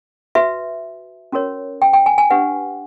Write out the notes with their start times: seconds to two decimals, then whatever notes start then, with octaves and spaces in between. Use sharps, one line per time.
0.35 F#4 B4 E5
1.32 C#4 F#4 A#4 C#5
1.82 G5
1.93 G5
2.06 G#5
2.18 G#5
2.31 D4 G4 B4 F#5